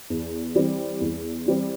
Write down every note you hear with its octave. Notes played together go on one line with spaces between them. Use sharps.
E2
E3 G3 C4
E2
E3 G3 C4